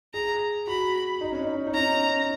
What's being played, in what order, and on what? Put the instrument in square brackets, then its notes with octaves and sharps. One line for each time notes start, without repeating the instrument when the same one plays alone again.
[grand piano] G#4 [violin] A#5
[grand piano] F#4 [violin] B5
[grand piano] D#4
C#4
D#4
D#4
[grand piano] C#4 [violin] A#5